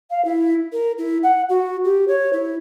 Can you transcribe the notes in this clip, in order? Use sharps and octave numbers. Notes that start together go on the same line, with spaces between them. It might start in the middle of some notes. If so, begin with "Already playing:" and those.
F5
E4
A#4
E4
F#5
F#4
G4
C#5
E4